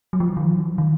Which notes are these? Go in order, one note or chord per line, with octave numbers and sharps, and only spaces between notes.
F#3
F3
E3
D#3
F3
F#3
F3
E3
D#3